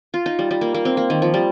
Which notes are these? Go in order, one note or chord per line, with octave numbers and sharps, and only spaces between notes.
F4
D#4
G3
G3
A#3
A#3
C4
A#3
D#3
F3
G3